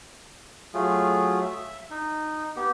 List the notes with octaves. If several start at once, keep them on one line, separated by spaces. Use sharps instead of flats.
F#3 A3 F4 G#4
E5
D#4
B3 G4